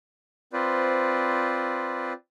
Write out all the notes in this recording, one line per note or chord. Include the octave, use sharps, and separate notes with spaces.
C4 F4 B4 C5 D5